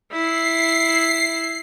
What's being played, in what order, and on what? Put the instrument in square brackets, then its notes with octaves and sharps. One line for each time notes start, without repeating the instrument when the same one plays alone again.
[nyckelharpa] E4 [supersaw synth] C7